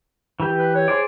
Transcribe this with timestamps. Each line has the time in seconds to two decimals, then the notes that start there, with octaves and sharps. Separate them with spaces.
0.40 E3 G4
0.58 B4
0.75 C#5
0.88 G#4 C5 D5